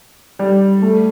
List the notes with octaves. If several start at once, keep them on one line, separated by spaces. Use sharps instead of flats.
G3
A3